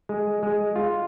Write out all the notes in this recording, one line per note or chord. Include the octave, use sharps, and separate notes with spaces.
G#3
G#3
F4